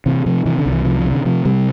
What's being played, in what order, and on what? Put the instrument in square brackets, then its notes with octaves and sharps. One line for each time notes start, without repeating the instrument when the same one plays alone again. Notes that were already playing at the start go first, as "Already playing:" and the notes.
[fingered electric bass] C3 E3
C3 F3
C3 E3
D3
C2
E3
C3 F3
F3
C3
D3
C3 F3
C3 G3